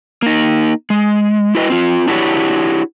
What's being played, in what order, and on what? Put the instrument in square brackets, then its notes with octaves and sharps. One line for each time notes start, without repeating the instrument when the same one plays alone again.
[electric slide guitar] A#3 D#4
G#3
E4 F#4 B4 D#5
C4 F4
D4 E4 F#4 G4 A4 C#5